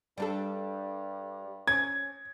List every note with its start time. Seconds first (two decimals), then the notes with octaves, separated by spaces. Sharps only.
0.18 G2 G3 D4 A4
1.67 C#4 G#6